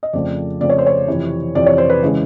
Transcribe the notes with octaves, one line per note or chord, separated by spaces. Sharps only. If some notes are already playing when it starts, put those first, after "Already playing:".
D#5
F2 C#3 F3 A3 C4 D5
F2 C#3 F3 A3 C4 D5
C#5
C5
C#5
F2 C3 E3
F2 C3 E3 D5
C#5
C5
B4
C#3 E3 G#3 C#4